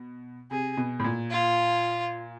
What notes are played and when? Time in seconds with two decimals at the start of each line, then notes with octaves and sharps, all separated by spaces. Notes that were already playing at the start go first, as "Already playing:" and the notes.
Already playing: B2
0.51 C3 G#4
0.77 B2
1.00 A2
1.04 A#2
1.30 F4